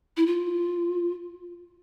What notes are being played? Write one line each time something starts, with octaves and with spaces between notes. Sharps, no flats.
E4
F4